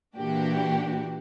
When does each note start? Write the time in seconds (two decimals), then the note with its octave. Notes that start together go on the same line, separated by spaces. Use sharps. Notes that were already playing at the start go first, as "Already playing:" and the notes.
0.16 A#2 E3 D4 F#4 G4